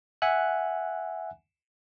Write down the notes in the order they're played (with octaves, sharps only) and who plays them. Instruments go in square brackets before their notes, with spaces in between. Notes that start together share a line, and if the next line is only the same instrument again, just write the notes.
[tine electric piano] E5 F#5 G#5 F#6